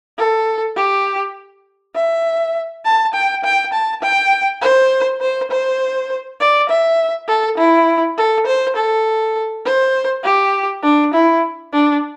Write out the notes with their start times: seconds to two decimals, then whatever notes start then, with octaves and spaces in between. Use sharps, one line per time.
0.19 A4
0.77 G4
1.95 E5
2.85 A5
3.14 G5
3.44 G5
3.73 A5
4.03 G5
4.62 C5
5.21 C5
5.51 C5
6.40 D5
6.69 E5
7.28 A4
7.58 E4
8.18 A4
8.47 C5
8.76 A4
9.66 C5
10.25 G4
10.83 D4
11.14 E4
11.73 D4